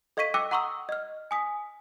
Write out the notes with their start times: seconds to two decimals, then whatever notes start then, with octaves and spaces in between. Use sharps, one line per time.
0.17 A4 D#5 F5 C#6 B6 D#7
0.34 G5 D6 E6 F#6 A#6 D#7
0.51 F#5 A#5 C6 C#6 D#6 E6
0.89 D#5 F6
1.31 G#5 D#6 B6